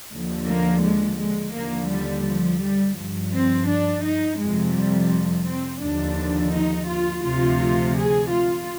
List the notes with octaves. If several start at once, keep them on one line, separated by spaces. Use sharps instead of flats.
D#2 D3 F3
A#3
G#3
G#3
D#2 D3 F3 A#3
G3
F3
G3
G2 F3
C4
D4
D#4
F2 C3 F3 G#3
G3
F3
C4
D#2 D3 F3 D4
D#4
F4
D2 C3 F3 F4
G#4
F4